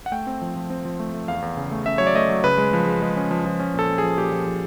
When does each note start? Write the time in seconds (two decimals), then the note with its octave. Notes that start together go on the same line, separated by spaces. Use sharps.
0.06 F#5
0.12 A3 G5
0.27 C4
0.42 F3
0.56 F3
0.70 C4
0.85 F3
0.99 A3
1.14 A3
1.28 E2 F5
1.42 E2
1.57 C#3
1.71 A3
1.86 C#3 E5
1.98 F#3 C#5
2.07 D5
2.15 A3 D#5
2.29 F#3
2.44 C#3 B4
2.58 G#3
2.73 F3
2.87 G#3
3.02 G#3
3.16 C#4
3.31 F3
3.46 F3
3.60 C#4
3.74 A#2
3.79 A4
3.88 C#4
3.98 F3 G#4
4.17 A#2 G4
4.32 F3
4.46 F3